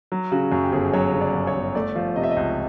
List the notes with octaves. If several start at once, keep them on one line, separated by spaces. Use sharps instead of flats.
F#3
C#3 F#4
F#2
G4
G1 G#4
F#3 C#5
C#3
D5
F#2
C#5
G1
A3 D5
F3
C3 D#5
E5
D#5
C#2